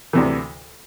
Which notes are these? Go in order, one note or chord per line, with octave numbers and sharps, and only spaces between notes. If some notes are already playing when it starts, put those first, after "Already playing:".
D2 C3 E3